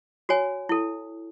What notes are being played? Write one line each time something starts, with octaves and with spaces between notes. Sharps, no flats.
F#4 C#5 G#5
E4 A4